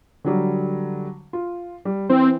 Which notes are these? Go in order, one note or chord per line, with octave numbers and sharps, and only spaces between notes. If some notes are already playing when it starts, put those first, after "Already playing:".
D3 F#3 G3
F4
G3
E3 C4